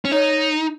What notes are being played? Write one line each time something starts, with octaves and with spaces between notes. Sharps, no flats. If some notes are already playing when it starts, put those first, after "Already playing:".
C#4
D#4 C#5